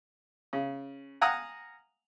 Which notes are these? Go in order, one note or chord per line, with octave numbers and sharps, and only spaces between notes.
C#3
F5 F#5 G#5 A#5 D#6